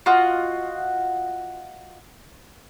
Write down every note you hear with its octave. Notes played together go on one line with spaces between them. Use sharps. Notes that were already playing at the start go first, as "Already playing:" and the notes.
F4 F#4 D#5